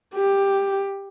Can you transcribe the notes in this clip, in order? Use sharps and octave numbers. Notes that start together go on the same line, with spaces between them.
G4